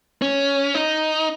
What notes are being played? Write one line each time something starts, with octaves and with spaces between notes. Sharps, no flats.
C#4
D#4